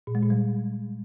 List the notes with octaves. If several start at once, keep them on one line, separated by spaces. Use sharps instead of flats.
A#2
G#3
A#2
G3